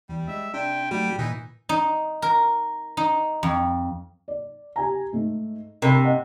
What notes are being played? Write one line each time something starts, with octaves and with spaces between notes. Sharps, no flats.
E2 G3
G#3 E5
C3 D4 G5
G#2 F#3 G3 A3 F#4 G4
A#2 D#3 E3 D#4
D#4
A#4
D#4
F2
D5
G4 G#5 A#5
G#2 A3
C3 A#4 B5
D#5 F#5